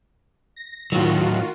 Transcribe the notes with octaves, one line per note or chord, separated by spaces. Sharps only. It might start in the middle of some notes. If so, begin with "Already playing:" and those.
A#6
A2 D#3 F#3 F4 F#4